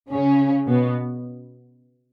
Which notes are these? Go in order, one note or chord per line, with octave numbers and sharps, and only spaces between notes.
C#3 C#4
B2 B3